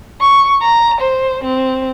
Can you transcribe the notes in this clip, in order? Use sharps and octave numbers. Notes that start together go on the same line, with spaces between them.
C#6
A#5
C5
C4